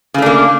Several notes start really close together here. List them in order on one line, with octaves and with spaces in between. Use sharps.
C#3 A3 D4 A#3